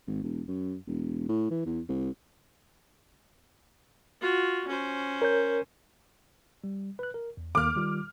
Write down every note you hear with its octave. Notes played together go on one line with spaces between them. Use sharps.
G#1
E1
F#2
E1
A2
E3
E2
C2
F4 F#4
C#4 C5
A#4 C#5 G6
G3
B4 F#6
A#4
E2
D#2 D#3 A#3 D6 F6
D#3 G3 F4